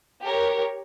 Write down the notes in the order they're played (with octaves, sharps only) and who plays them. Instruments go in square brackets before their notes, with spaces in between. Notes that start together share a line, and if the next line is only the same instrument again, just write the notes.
[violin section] G4 A#4 C#5